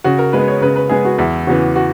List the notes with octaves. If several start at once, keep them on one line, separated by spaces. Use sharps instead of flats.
C#3 F#4
A#4
G#3 B3 B4
C#5
C#3 B4
B4
G#3 B3 G#4
F#4
E2 E4
C#3 E3 B3 F#4
F#4